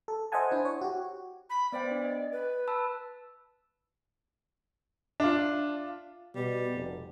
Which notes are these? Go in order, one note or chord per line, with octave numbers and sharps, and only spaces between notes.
A4
C5 D#5 E5 F#5 G#5 A5
D4 E4 C5
C#5
F#4 G4
B5
B3 C5 D5 G5
D4
D#5
B4
A5 B5 E6
D4 F4 E5
B2 G3
F1